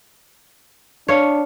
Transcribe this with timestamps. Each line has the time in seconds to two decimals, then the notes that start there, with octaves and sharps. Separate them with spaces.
1.08 D4 C#5 F5